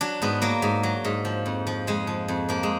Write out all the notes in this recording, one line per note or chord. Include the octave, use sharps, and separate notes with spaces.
F#3 D4
G#2 B3
F#3 A#3
G#2
F#3
G#2
F3
F2
F3
F2 G#3
F3
F2
F3 A#3
G#3